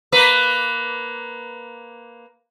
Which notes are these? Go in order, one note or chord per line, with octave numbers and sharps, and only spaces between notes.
A#3 B4